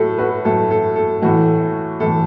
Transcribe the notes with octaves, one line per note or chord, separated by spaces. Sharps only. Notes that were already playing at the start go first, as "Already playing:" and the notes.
Already playing: A2 F#3 A3 A4
F#4 B4
A2 F#3 A3 A4
A4
A4
A2 E3 A3 F#4
A2 E3 A3 A4